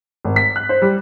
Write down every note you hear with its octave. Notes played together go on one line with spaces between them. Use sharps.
G#1
B6
F#6
C5
G3